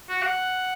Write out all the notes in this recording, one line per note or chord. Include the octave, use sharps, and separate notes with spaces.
F#4
F#5